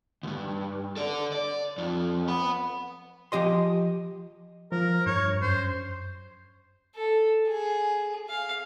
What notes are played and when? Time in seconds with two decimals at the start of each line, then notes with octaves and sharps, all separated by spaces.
0.23 D2 G2
0.97 A4 D5
1.32 D5
1.78 F2
2.28 F#5 B5
3.32 F3 G4 D#5 C6
4.72 F3 A#4
5.06 G2 C#5
5.42 F#2 C5
6.95 A4
7.49 G#4
8.30 F5